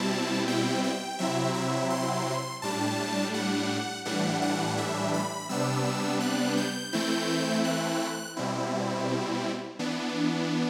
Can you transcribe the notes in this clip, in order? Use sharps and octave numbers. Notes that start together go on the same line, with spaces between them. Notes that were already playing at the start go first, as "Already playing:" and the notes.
Already playing: B2 G3 C4 E4 A5
G5
G5
C3 F#3 C4 E4 E5
E5
C6
A2 G3 D4 A5
F#5
A2 E3 G3 D4 F#5
F#5
E5
B5
C3 G3 B3 D4 E6
F#6
G6
E3 A3 C4 E4 G6
F#6
B2 G3 C4 E4
E3 B3 D4